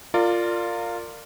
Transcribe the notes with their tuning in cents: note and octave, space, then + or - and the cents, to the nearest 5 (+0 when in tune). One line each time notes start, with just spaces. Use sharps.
F4 +0 A#4 -30 D5 +10